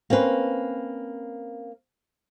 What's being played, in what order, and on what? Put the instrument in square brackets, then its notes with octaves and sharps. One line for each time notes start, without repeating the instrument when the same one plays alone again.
[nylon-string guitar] A#3 C4 C#4 B4